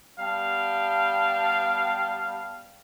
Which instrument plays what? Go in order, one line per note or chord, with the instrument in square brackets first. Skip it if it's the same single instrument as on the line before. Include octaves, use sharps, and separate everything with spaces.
[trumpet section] G3 B3 F5 G5 A5